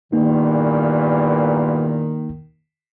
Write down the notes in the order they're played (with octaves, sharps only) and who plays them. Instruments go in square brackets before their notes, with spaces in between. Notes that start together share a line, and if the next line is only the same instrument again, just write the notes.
[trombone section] E2 G2 A#2 [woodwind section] D#3 [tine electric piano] A#3 D#4